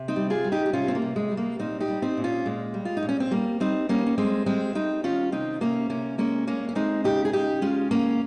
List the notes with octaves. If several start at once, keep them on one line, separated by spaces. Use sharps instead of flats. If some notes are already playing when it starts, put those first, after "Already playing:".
Already playing: C3
C4 D#4
G3
F4 G#4
G3
D#4 G4
G4
C3 C#4 F4
C4
A#3
C3
G#3
G3
A#3
A#2 C4 D#4
D#4 G4
G3
C4 D#4
A#2
C#4 F4
A#2 G#3
G3
F4
D#4
A#2
C#4
C4
G3 A#3
G3 C4 D#4
G3 A#3 C#4
C#4
G3 G#3 C4
G3 G#3 C4
G3 C4 D#4
D#3 C#4 F4
C3 C4 D#4
C3 A#3 C#4
C3 A#3 C#4
G#3 A#3 C#4
G#3 A#3 C#4
C#4
G#3 C4 D#4
C#3 D#4 G4
G#4
C#3 D#4 G4
G#3 C#4 F4
C#3 A#3 C#4